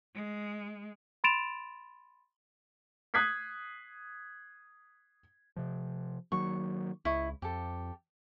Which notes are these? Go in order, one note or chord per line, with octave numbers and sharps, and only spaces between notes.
G#3
B5 C6 A6 D7 E7 F7
D#6 F#6 G#6 B6 C7
C3 F3
D#3 F#3 A#3 C#6
C#2 E4 D#5 C#6
F2 G4 A4